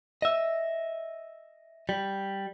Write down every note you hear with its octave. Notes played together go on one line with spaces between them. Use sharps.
D#5 E5
G3